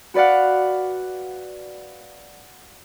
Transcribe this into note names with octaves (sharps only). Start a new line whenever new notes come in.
F#4 B4 D5 F5 F#5